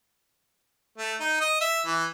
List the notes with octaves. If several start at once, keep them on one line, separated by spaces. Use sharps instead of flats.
A3
D#4
D#5
E5
E3